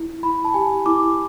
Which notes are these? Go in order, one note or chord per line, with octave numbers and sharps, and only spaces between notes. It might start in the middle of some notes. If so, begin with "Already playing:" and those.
Already playing: E4
E4 B5
A5
G4 G#5
E4 D6